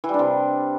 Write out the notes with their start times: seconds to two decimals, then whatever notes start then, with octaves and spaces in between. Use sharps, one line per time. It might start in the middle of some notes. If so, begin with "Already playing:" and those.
0.04 E3
0.09 G3
0.14 D4
0.19 C3